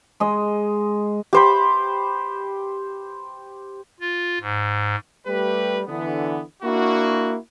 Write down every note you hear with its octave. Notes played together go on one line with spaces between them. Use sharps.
G#3 D#5
G4 C5 B5
F4
G#2
G3 A3 G4 B4
D3 E3 B3
A#3 D4 E4 F#4